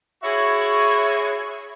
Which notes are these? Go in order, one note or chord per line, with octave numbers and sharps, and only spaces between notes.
E4 F#4 G#4 C#5 E5